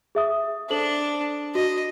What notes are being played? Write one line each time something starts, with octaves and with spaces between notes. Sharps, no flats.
G#4 E5 D#6
D4 A4 C5 F#7
F#4 D#5